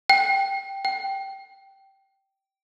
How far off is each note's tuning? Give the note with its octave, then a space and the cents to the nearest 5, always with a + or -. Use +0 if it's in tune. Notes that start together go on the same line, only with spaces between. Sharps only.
G5 +0
G5 -10